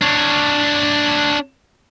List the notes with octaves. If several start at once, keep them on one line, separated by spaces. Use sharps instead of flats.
D4 C#5